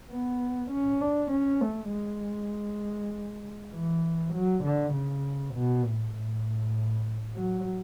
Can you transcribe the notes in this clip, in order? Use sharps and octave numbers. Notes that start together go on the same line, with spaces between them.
B3
C#4
D4
C#4
A3
G#3
E3
F#3
D3
C#3
B2
A2
A2
F#3